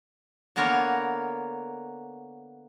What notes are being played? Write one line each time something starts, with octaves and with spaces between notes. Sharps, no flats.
D3 A#3 B3 A#4 C#5